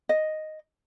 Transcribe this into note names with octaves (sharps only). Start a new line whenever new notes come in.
D#5